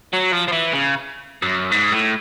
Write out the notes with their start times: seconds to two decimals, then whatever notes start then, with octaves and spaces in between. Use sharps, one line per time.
0.13 F#3
0.33 F3
0.48 F3
0.52 E3
0.73 C#3
1.43 F#2
1.71 G#2
1.92 A2